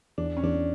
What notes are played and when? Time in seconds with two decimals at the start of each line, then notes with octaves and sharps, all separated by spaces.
0.18 E2 D4
0.37 C#4
0.43 E2 D4